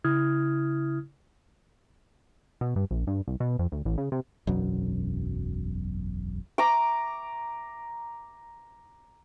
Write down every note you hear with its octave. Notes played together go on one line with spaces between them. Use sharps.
C#3 E4 D#6 F6 G#6
B2
G2
A#1
G2
C2
B2
F2
D2
A1
C#3
C3
E1 B1 F#2 F#3
A#5 D6